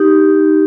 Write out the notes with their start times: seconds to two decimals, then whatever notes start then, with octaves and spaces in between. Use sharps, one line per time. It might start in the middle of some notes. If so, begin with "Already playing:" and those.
Already playing: D#4 G4